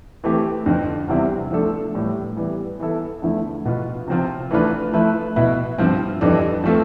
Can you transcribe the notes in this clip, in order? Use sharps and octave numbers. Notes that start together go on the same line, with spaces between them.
E3 A3 C4 G4
F2 D3 F3
E2 C3 G3 C4 E4
F3 A3 D4 A4
A2 E3 G3
E3 G3 B3
E3 B3 E4 A4
E2 D3 F3 A3 E4
B2 B3 F4
C3 F3 C4 F4
E3 A3 D4 F4 B4
F3 A3 E4 B4
B2 B3 E4 B4
G2 F3 C4 F4
F2 E3 G3 D4 A4
F3 A3 C4 F4 A4